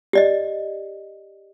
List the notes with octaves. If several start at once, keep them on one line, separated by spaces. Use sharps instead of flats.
G4 D5 D#5